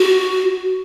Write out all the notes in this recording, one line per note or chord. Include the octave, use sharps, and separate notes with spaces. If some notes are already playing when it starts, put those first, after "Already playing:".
Already playing: F#4